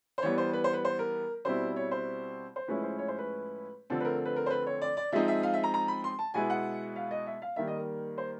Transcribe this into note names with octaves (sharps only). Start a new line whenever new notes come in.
C5
E3 G3 B3 C#5
C5
B4
C5
B4
C5
A#4
B2 G3 C4 E4 C5
C#5
C5
C5
A2 F3 G#3 C#4 E4 B4
C5
C#5
C5
B4
D3 F3 A3 C4 A4
B4
A#4
B4
A#4
C5
B4
C#5
D5
D5
F3 G#3 C4 D#4 E5
E5
F5
E5
A#5
A#5
B5
C6
A5
B2 G#3 B3 E4 G#5
F#5
F5
D#5
E5
F5
D#3 G3 A#3 E5
D#5
A#4
C5